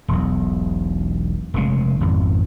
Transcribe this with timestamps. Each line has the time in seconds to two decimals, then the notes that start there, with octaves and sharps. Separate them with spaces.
0.08 E1 B1
1.54 F1 C#3 G#3
2.00 G#1 F2